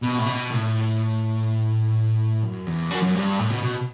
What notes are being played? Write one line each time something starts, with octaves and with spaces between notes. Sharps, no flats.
B2
A2
B2
A2
F#2
E2
F#2
F#2
G2
A2
B2
B2